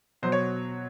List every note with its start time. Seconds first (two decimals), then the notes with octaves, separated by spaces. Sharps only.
0.23 B2 F#3 C5
0.32 C#5